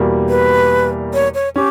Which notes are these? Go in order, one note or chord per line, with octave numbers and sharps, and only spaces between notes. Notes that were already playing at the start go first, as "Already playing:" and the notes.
Already playing: E2 B2 G3 A#3
B4
C#5
C#5
C#4 G4